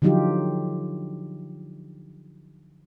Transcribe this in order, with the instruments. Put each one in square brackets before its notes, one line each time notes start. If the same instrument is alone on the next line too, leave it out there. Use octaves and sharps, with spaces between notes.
[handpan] D3 F3 F#3 D#4 F4 G4